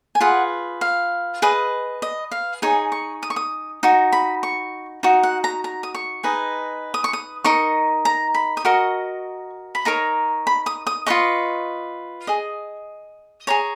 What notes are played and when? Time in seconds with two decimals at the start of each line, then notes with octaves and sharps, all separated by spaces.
0.15 G#5
0.20 F4 G#4 B4 F#5
0.81 F5
1.42 G#4 B4 D#5
2.02 D#5
2.31 F5
2.62 D#4 G#4 C#5 G#5
2.92 C#6
3.23 D#6
3.30 C#6
3.36 D#6
3.83 D#4 F#4
4.12 B5
4.43 C#6
5.03 D#4 F#4
5.23 F#5
5.44 A#5
5.64 A#5
5.83 D#6
5.94 C#6
6.23 D#4 G#4 B4 D#5
6.94 D#6
7.04 C#6
7.13 D#6
7.44 D#4 A#4 D#5 C#6
8.05 A#5
8.35 B5
8.57 D#6
8.65 F#4 A#4 D#5 C#6
9.75 B5
9.85 D#4 A#4 C#5 A#5
10.47 B5
10.66 D#6
10.87 D#6
11.06 F4 B4 D#5 C#6
12.27 G#4 D#5
13.47 G#4 C#5 A#5